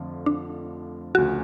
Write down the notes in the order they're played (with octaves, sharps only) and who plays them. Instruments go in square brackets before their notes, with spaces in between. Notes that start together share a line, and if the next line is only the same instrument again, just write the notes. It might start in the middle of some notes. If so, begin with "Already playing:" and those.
Already playing: [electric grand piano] F2 D3 F3 A3 F4
[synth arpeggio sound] D4
[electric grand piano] D2 C#3 F3 [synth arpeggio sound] F#4